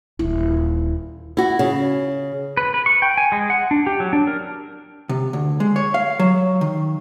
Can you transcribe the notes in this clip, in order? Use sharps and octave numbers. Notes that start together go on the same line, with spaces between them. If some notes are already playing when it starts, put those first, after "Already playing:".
D#1 E4
E4 F#4
C#3
B4
B4
C#6
G5
G#5
G#3
F#5
D4
G4
F#3
D4
A#4
C3
D2
G#3
C#5
F5
F#3
D#3